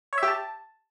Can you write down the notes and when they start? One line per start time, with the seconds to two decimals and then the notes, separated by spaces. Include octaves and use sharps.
0.13 C#5
0.18 E5
0.23 G4
0.28 A5